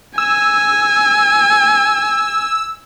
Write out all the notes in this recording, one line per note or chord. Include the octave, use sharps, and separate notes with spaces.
G#5 E6